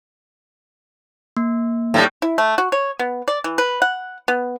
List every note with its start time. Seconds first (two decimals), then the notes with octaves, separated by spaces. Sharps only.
1.37 A#3
1.94 A2 E3 G3
2.22 E4
2.38 A3
2.58 F#4
2.72 C#5
2.99 B3
3.28 D5
3.44 E3
3.58 B4
3.82 F#5
4.28 B3